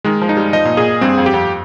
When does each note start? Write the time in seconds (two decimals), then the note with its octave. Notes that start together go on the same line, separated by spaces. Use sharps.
0.04 D#3 G#3
0.21 F3
0.29 D#4
0.37 G3
0.53 F3 D#5
0.65 A#2
0.77 A#2 G#4
1.01 G2 C4
1.18 F2
1.26 G4
1.34 F2